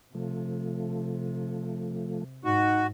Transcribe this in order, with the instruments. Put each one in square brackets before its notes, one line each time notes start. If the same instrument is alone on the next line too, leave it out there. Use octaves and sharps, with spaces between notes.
[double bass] C3 [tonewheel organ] F3 A3
[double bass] G#2 [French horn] D#4 [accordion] F#4